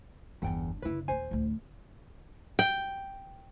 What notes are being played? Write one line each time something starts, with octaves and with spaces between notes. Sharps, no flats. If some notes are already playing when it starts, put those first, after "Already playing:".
G1 E2 D4 F#5 G5
F#1 D3 E4 B4
D#2 A#2 C5 G#5
A1 D2
G5